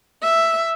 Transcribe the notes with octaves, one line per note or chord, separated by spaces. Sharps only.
E5